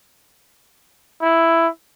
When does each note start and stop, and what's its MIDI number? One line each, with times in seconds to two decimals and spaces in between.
1.22 1.68 64